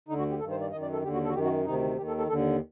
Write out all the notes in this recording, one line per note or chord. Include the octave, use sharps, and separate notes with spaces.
D2 D3 D#4
F#4
G4
G2 D#3 A4
C5
D5
F#2 D#3 D#5
D5
A4
D#2 D3 G4
F#4
A4
F#4
F#2 D#3 G4
F#4
D2 C3 D#3 D#4
D#2 D#3 G4
A4
A4
D#2 D3 A4